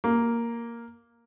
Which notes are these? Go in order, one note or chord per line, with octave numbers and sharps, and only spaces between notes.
A#3